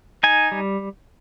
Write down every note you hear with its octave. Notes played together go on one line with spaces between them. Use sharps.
D#4 G#5
G3